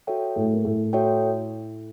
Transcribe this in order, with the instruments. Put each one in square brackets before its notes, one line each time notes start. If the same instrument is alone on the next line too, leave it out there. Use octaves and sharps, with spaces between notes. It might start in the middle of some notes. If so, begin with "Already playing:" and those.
[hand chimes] F#4 A4 C#5 E5 G5
[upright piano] A2 A3
A#3
A2 A3
[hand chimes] F#4 A4 C#5 E5 G5